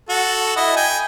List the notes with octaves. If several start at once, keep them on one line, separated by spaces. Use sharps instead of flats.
F#4 A4
E4 D#5
G5 G#5